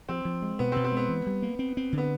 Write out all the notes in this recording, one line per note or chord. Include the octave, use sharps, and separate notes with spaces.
F3 C4
F3
G#3
B2 B3
C4
B2
C4
G#3
B3
E3
G3
A#3
C4
C4
D3
B3